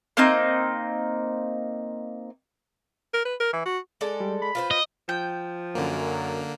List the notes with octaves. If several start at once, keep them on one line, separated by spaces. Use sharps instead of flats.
A#3 C4 D#4
A#4
B4
A#4
E3
F#4
G#3 A4 D5
G3
B5
F4 B4 C5
D#5
F3 G5
F#2 D3 A#3